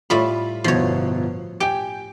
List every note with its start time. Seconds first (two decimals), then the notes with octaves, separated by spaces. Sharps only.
0.10 A2 G3 F4 E5 B5
0.64 G1 B2 F3 E4 C#5
1.60 G4 G5 G#5 D7